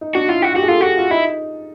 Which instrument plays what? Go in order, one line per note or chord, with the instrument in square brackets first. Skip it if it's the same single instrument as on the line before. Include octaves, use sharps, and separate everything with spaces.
[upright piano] D#4
[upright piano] D4 [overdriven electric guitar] F#4
[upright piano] E4 [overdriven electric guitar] F4
[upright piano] F4 [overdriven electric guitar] F#4
[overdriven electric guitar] F#4 [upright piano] G4
[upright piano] G#4
[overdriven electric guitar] F4 [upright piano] A4
[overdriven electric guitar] F#4 [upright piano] G4
[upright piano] F4
[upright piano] D#4 [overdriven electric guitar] E4